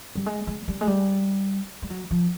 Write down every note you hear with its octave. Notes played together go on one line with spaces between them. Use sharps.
G3
G#3
G#3
G3
G#3
G3
G3
F#3
F3